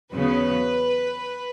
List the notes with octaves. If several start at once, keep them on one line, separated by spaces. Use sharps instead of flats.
E2 C#3 F#3 B3 B4